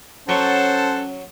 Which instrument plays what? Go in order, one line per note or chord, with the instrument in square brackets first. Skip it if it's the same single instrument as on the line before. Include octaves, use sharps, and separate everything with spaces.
[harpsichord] F#3 C6 C#6 [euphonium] C#4 [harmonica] A4 C5 A5 [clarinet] F#5